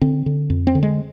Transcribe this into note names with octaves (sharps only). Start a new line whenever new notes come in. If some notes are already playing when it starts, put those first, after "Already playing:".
D3 C4
D3
F2
C4
D3
G#3